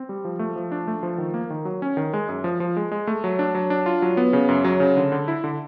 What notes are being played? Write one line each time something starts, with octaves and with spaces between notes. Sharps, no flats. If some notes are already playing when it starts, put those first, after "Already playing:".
Already playing: C4
G3
F3
A3
F3
D4
A3
F3
D#3
A#3
D#3
F#3
C#4
D#3
G#3
F#2
F3
F3
G#3
G#3
A3
F#3
D4
F#3
D4
F4
F#3
B3
C#3
F#2
F#3
C#3
D3
D3
E4
D3